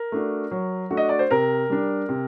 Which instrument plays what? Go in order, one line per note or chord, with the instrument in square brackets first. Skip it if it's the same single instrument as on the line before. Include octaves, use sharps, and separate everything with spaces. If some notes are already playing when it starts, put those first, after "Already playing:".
Already playing: [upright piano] A#4
[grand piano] A3 D4 F#4
F#3
A3 D4 F#4
[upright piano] D#5
D5
C5
[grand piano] C3 [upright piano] A#4
[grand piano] G3 D4
C3